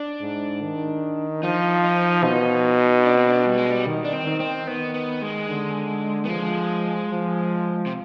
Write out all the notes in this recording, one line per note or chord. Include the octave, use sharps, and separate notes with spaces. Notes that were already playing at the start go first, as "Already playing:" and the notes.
Already playing: D4
G#2
D#3
F3 D#4
D#4
B2 D#4
D4
C4
D4
G3
G#3
G3
D#3
D4
C4
D#3
C4
D#3 B3
B3
G#3
D3
B3
F3 G#3
F3
C3